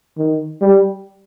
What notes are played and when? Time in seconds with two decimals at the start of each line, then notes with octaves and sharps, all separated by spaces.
0.17 D#3
0.61 G3